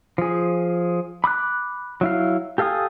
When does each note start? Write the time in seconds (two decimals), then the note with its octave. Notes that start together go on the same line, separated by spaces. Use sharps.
0.18 F3 G#4
1.24 B5 D6 D#6 F#6
2.01 F#3 E4 F5
2.58 G4 A4 F5 G#5 D#6